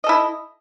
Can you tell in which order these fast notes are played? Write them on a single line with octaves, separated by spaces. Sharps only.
D#5 A4 E4